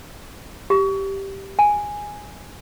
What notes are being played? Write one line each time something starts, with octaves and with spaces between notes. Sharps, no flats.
G4
G#5